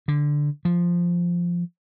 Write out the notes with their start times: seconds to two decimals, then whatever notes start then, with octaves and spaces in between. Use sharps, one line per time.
0.08 D3
0.65 F3